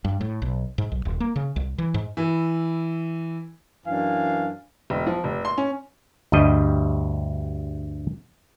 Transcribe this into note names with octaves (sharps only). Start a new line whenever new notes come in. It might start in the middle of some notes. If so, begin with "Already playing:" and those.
G2
A2
B1
G#2
B1
D#1
A#3
C#3
C2
E3
G#2
E3
F#2 E3 D4 F5 G#5
E1
F3
F1
C6
C#4
D2 G2 G3 D#5